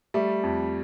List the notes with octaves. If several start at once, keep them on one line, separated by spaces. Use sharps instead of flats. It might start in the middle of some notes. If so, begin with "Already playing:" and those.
G3 A3
F2